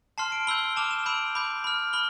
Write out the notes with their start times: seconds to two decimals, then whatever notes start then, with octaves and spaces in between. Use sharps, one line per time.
0.18 A5 C6 F6 C7
0.32 D7
0.47 B5 E6 G6 G7
0.76 A5 D6 F6 F7
0.91 E7
1.06 B5 E6 G6 D7
1.35 B5 D6 G6 F7
1.64 B5 F6
1.93 B5 F6 G7